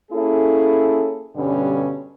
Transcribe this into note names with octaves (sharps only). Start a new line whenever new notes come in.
A#3 C#4 E4 G#4 A4
G2 B2 D3 G3 C#4